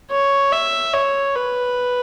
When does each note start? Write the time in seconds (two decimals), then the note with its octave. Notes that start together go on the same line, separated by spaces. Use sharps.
0.11 C#5
0.52 E5
0.93 C#5
1.35 B4